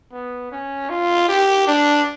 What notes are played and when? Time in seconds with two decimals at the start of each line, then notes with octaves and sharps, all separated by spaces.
0.12 B3
0.52 C#4
0.89 F4
1.28 G4
1.67 D4